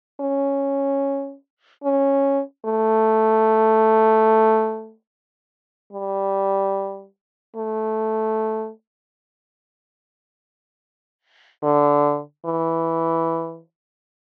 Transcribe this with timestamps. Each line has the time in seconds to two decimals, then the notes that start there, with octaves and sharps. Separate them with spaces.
0.21 C#4
1.84 C#4
2.65 A3
5.93 G3
7.56 A3
11.63 D3
12.46 E3